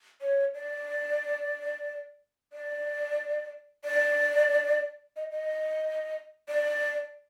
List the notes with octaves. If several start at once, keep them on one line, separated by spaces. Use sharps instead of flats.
C#5
D5
D5
D5
D#5
D#5
D5